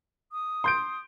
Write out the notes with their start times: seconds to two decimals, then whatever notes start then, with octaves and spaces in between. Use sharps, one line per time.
0.32 D#6
0.64 C6 G6 D7